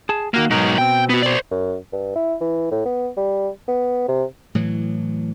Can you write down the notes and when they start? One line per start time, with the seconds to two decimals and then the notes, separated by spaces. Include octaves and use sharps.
0.09 G#4 A5
0.34 D#3 A#3 F#4 F5
0.50 G#2 B2 F#3 D#4 A#4
0.78 B2 C4 G5
1.09 B3 F#4
1.23 C5 D5
1.51 F#2
1.92 G2
2.16 E4
2.41 E3
2.71 A2
2.85 B3
3.17 G3
3.68 B3
4.08 C3
4.55 A2 E3 F#3